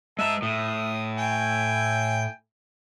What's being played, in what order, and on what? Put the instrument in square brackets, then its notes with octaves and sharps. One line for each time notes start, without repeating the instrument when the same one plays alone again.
[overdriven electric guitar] G#3 A#5 [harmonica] E5 A5
[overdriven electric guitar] A2 [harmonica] D#6
[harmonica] G5 G#5